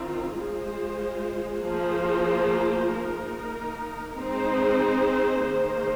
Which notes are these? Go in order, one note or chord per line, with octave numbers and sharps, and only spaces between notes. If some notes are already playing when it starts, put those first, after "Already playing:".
Already playing: D#3 C4 F4
G#3 F4 G#4 C5
F3 A#3 F4 G#4 C5
A#3 D#4 A#4
G#3 C4 D#4 G#4 C5
D#3 A#3 G#4 C5